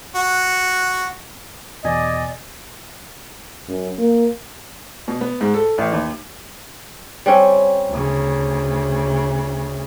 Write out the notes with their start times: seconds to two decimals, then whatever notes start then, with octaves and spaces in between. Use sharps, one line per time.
0.15 F#4
1.84 E2 B2 D5 D#5 G#5
3.69 F#2
3.99 A#3
5.08 B2
5.21 B3
5.41 G#2
5.54 A4
5.78 A1
5.92 D#2
7.26 G3 C4 C#4
7.90 D2 C#3